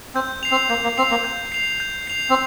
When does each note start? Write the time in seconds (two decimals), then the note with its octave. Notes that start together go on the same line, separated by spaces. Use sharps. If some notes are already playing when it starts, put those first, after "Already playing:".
0.14 C4 G6
0.43 C7 F7
0.51 C4
0.69 A#3 G6
0.84 A#3
0.98 C4 C7 F7
1.11 A#3
1.24 G6
1.52 C7 F7
1.80 G6
2.07 C7 F7
2.30 C4